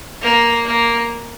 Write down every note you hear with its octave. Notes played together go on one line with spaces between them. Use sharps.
A#3
A#3